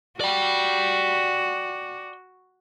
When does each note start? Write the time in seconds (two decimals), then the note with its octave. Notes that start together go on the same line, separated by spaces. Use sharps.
0.21 F#4 D5 G5